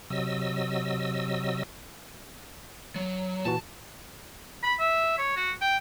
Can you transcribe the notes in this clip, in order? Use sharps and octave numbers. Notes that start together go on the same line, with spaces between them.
C3 F#3 D#5 E6
F#3
A#2 E3 F#4 A5
B5
E5
C#5
F#4
G5